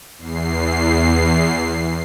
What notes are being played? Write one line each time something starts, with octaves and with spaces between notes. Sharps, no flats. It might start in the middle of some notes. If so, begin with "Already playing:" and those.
E2 C7